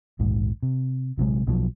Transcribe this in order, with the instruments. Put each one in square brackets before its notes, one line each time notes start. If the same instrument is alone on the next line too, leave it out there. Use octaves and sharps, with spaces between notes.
[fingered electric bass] A#1 D#2 G#2
C3
A#1 C3 F#3 G#3
B1 B2 F3 F#3